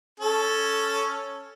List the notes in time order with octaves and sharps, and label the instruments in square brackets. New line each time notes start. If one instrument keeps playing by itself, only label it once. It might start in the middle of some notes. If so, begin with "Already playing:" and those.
[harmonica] C#4 A4